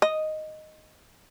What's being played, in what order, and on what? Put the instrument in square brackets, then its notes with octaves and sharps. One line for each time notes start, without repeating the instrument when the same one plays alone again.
[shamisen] D#5